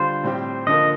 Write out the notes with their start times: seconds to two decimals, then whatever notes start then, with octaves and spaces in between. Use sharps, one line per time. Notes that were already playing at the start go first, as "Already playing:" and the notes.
Already playing: D3 G3 D4 F4 C5
0.23 A2 G3 C4 G4
0.67 D3 F3 A#3 D#5